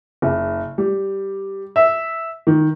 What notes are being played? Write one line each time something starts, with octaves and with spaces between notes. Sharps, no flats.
F#1
G3
E5
D#3